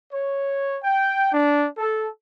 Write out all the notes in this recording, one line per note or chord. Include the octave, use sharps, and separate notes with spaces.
C#5
G5
D4
A4